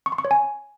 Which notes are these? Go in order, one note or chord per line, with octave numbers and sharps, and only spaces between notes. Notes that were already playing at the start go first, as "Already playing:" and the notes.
C#6
C6
C#6
C#5
G#5